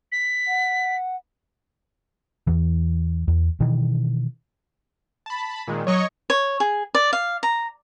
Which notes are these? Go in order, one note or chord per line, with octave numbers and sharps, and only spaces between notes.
B6
F#5
E2 E3
E2
B2 D#3 E3
A5 B5
A#2 D#3 G#3
F#3 C#5 D#5 C#6
C#5
G#4
D5
F5
A#5